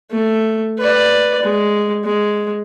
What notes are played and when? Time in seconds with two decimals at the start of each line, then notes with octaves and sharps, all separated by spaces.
0.11 A3
0.78 B4 D5
1.42 G#3
2.04 G#3